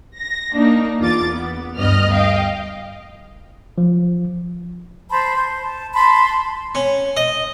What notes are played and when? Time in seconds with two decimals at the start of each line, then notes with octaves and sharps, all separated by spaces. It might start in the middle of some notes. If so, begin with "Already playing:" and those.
0.18 A#6
0.53 A#3 D4 D#4
1.00 E2 F4 D6 A6
1.31 B3
1.77 D2 G2 B3 D#5 F6
2.13 D#5 F5 G5
3.78 F3
5.11 C5 A5 B5
5.35 C5
5.63 A5
5.94 A5 B5 C6
6.75 C#4
7.17 D#5